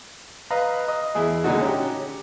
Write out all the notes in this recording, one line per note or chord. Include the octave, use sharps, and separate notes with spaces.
B4 D#5 F5 A#5
D#5
E2 E4 G#4
A#2 D3 G#3 A3 D#4 F#4
C#4 G4